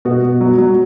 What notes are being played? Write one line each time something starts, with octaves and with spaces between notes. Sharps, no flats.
B2 F#4
B2
F#3
F#3